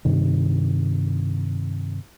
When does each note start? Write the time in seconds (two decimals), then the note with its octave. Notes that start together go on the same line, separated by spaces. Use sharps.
0.05 G2 C3 D#3